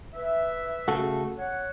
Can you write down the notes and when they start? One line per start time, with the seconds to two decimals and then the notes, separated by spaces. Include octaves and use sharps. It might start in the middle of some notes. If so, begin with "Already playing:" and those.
0.14 B4 E5
0.88 C#3 A3 F#4 A4
1.38 C#5 F#5